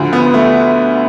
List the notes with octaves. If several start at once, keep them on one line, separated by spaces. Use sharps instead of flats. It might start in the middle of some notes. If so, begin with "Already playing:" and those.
Already playing: D2 D3 F3
B3
A3